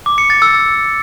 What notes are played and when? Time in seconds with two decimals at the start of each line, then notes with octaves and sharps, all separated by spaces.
0.06 D6
0.18 C#7
0.30 A6
0.42 E6